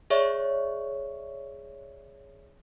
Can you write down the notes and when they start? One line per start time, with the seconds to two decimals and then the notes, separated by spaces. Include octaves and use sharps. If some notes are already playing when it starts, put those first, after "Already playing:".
0.10 G#4 C#5 D5 E5 C#6